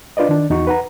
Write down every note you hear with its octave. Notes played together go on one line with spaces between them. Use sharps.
D4 F4 B4 D5 D#5
D#3 D4
E2 D#4 F#4 C#6
B4 F#5 A#5